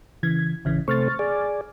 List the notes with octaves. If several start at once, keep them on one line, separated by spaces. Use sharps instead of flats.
C#3 E3 G#6
A1 C#3 E3
C3 A3 C5 C#6 F6 A6
G#4 D5